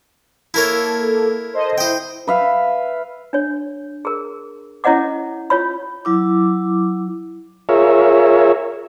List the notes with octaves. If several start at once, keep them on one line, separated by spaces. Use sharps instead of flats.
A#3 E4 A4 A#4 C#5
A4 C5 D#5
E4 C5 D#5 G5
B4 E5 F5
D4 C#5
G#4 A#4
C#4 E4 C#5 D#5 F#5 D6
F4 C#5 B5
F#3 E4 D6
F4 G#4 A#4 C#5 E5